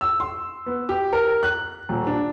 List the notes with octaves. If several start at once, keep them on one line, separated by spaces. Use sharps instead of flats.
E6
C6
B3
G4
A#4
F#6
D#1
D4